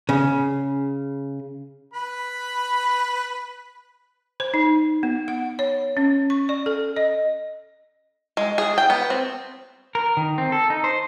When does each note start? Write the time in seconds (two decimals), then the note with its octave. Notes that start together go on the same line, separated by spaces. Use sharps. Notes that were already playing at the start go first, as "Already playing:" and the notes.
0.09 C#3
1.93 B4 B5
4.40 C5
4.54 D#4
5.03 B3
5.28 F#5
5.59 C#5
5.97 C#4
6.30 C#6
6.49 D5
6.66 A4
6.96 D#5
8.37 G#3
8.58 G#4
8.78 G5
8.90 B3
9.10 C4
9.95 A#4
10.17 D#3
10.38 C4
10.52 A4
10.70 D#4
10.84 C5